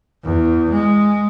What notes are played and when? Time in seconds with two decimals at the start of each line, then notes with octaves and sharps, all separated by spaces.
0.24 E2
0.72 G#3